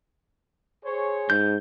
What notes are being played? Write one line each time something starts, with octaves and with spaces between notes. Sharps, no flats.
G#4 C5 C#5
G#2 G6